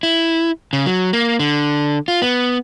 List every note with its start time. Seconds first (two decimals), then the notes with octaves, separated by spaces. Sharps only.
0.03 E4
0.73 C#3
0.86 F#3
1.13 A#3
1.40 D3
2.08 F4
2.22 B3